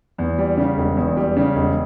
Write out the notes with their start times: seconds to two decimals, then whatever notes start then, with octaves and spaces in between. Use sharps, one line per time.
0.18 E2
0.38 G3
0.57 C#3
0.77 E1
0.97 E2
1.17 G3
1.36 C#3
1.55 E1